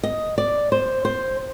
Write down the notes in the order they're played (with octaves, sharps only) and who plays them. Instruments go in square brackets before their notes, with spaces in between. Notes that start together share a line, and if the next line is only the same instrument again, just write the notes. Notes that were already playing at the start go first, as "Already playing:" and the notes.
[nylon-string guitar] D#5
D5
C5
C5